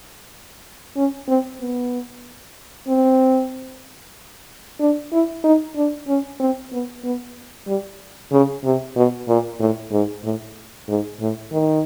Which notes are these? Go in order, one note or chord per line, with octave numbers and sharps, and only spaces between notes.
C#4
C4
B3
C4
D4
E4
D#4
D4
C#4
C4
B3
B3
G3
C#3
C3
B2
A#2
A2
G#2
A2
G#2
A2
D#3